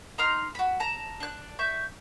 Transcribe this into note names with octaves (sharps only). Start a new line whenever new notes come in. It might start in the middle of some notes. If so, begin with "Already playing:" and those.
D#4 A#5 C6 F6
F#4 B5
A5 A#5
D4 F#6
E5 C#6 G6